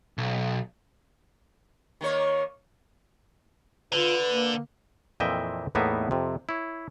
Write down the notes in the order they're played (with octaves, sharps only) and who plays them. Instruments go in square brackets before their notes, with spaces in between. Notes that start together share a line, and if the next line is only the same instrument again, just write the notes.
[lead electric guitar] B1
[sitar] D#3 A#3 C#5
[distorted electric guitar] D3 [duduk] F4 [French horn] B4
[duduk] A#3
[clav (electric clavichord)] F2 A#2 E3 D#5 E5 G5
E2 A2 A#3 B3 D#4 E5
F2 C3
E4 C#5